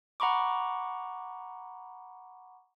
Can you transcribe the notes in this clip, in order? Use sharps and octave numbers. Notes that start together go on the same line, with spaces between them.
F#5 A#5 B5 C#6 D6